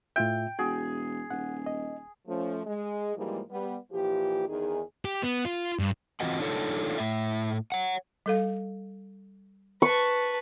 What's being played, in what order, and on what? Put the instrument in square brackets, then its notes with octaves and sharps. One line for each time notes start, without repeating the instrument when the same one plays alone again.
[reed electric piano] A2 F4 E5 [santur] G5
[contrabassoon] E1 [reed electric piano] F#4 [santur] G#4
[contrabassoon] D#1 [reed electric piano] F#5
[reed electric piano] D#5
[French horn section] F3 A3 C#4
G#3
G#2 E3 F3 G3 G#3 A#3
G3 B3
A#2 E3 F3 G4
E2 D#3 D#4 G#4
[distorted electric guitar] G4
B3
F4
G2
[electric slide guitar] E3 C4 F4 F#4 D#5 F#5
D4 D#4 F4 A4 C#5
A2 E5
C#5 F#5
[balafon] G3 A4 F5
[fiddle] B4 A5 [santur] C#6